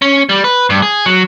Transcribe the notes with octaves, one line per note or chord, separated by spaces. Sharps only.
C#4
G3
B4
G2
G#4
F#3